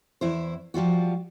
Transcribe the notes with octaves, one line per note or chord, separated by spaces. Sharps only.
E2 E4 C5
F3 G3 F4 F#4